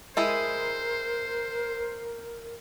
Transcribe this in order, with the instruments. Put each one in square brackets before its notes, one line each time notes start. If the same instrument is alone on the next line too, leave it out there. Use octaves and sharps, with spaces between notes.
[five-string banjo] G#3 E4 G#4 [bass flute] A#4 [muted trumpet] C5